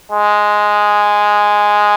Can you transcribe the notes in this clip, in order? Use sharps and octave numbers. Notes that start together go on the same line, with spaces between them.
G#3